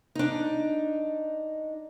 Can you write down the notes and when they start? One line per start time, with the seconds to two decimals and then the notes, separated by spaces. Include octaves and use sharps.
0.15 D4 D#4